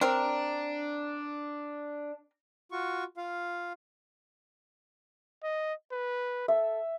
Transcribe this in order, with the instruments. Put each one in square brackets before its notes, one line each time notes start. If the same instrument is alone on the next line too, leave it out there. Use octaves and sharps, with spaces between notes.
[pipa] C4 A#4 [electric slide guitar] D4
[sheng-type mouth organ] F4 F#4 C#6
F4 F5
[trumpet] D#5
B4
[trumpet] A4 [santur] E5